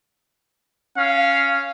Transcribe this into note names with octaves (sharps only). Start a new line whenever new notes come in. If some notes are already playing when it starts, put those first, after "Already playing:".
C#4 F5